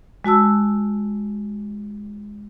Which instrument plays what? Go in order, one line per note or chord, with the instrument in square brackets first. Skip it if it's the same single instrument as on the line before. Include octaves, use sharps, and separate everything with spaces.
[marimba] G#3 F#4 A5 E6